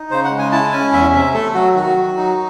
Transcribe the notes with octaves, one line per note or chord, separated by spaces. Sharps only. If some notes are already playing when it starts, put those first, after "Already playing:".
Already playing: D#4
C#3 C5
F#5
G#3
G#5
E4 A5
C#4 G#5
E2 E5
C3 E5
A3 A4
F#3 F#4
D#3 F#4
F#3
D#4